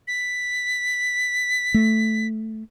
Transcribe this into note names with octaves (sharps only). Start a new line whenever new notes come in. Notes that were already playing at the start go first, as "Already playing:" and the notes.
B6
A3